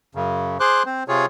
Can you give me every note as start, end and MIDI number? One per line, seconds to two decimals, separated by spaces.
0.15 0.58 42
0.15 0.58 49
0.60 0.83 68
0.60 0.83 72
0.60 0.83 84
0.60 0.83 86
0.60 0.83 90
0.86 1.04 60
0.86 1.04 72
1.08 1.26 48
1.08 1.26 65
1.08 1.26 68
1.08 1.26 73